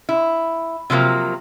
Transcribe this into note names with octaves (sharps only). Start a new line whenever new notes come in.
E4
C3 F3 F#3 A#3